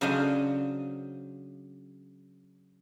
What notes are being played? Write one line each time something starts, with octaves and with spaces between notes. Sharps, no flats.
C#3 F#3 D4 C5 D#5 F5